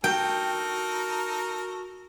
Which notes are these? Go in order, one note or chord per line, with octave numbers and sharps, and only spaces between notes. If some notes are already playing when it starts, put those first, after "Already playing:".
D#4 F#4 A4 A#4 G5